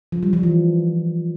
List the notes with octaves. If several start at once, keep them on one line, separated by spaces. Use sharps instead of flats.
F3
G3
F3
E3